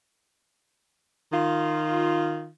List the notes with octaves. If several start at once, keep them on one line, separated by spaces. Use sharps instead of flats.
D#3 F4